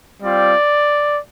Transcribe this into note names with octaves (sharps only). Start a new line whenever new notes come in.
G3 C4 F4 D5